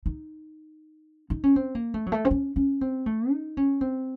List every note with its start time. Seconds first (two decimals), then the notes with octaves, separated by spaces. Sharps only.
0.06 D#4
1.30 D#4
1.44 C#4
1.56 C4
1.75 A#3
1.94 A3
2.06 F#3
2.12 A3
2.25 C4
2.31 C#4
2.56 C#4
2.81 C4
3.06 A3
3.31 D#4
3.57 C#4
3.81 C4